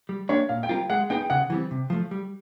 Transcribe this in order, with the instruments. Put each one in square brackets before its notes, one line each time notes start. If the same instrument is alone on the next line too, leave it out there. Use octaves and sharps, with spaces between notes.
[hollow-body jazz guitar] G3
[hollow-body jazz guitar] A#3 D4 G4 [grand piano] C#5
[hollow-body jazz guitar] A#2 [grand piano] F5
[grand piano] G5
[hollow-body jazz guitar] G3 C4 F4 A#4
[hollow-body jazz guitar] G#3 [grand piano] F#5
[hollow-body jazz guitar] B3 D#4 G#4 B4 [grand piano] G5
[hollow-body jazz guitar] C#3 [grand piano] F#5
[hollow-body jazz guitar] E3 G3 C4
C3
F3 A3
G3